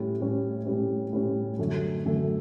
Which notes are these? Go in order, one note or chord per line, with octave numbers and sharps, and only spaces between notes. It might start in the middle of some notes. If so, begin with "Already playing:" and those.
Already playing: A2 G3 C#4
A2 G3 C#4
A2 G3 C#4
A2 G3 C#4
F#2 D3 A3
F#2 D3 A3